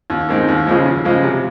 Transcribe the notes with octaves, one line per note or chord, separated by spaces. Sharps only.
D#2
D#3 G#3 C4
D#2
C#3 F3 G#3
D#2
C#3 F3 G#3
C3